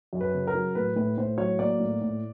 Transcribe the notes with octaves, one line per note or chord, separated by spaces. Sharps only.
F#2
B4
C#3
A#4
F#3
A2 B4
A2 B4
A2 C5
F#3 C#5
A#3 D5
A2
A2